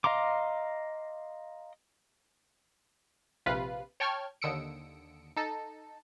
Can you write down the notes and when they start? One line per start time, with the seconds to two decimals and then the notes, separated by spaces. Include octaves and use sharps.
0.04 D#5 F5 A#5 C6 D6
3.46 A#1 C3 F4 B4 F5 F#6
4.00 C#5 G5 A5 C#6 F6 G#6
4.42 D#2 D3 D#6 E6 C#7 D7
5.36 D#4 A4